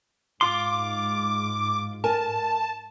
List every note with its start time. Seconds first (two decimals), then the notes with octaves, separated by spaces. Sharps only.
0.41 G#2 F4 C6 D6
2.04 A#4 G#5 A5